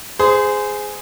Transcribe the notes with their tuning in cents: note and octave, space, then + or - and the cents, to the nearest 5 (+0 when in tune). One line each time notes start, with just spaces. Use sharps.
G#4 +0 C5 -25